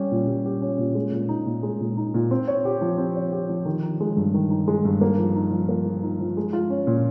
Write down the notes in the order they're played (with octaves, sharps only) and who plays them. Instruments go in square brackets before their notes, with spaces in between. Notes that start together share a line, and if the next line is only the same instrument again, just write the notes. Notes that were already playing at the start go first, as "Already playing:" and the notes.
Already playing: [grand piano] G3 C#4 G4
A#2
G3
G4
C#4
A#2
G#3
A#2
D#4
A#2
G#3
A#2
D#4
A#2
C4
C#5
G4
F3
C4
C#5
G4
F3
D#3
D#4
G#3
G2
D#3
D#4
G#3
G2
A#3
F3
D#4
F3
A#3
F3
D#4
F3
G#3
F4
C#4
A#2